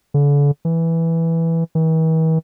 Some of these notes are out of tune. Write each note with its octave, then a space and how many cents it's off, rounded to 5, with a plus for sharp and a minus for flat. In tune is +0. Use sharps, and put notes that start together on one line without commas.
D3 -40
E3 +0
E3 -45